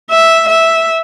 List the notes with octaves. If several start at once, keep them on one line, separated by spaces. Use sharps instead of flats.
E5
E5